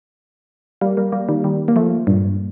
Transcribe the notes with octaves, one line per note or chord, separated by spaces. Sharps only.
G3 A#3
G3 A#3
G3 A#3
D#3 G3
D#3 G3
A#3
F3 A3
G2 A#2